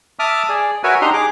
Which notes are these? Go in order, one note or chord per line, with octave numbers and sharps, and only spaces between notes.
E5 A5 D6 D#6 F6
G#4 D5
F#4 A#4 B4 C#5 E5 G#5
D4 D#4 G4 D#5 A#5 C6
G#4 D6